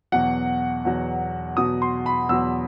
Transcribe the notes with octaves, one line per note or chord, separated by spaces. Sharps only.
E2 B2 F#3 F#5
E2 B2 F#3
E2 B2 F#3 D#6
C6
B5
E2 B2 F#3 E6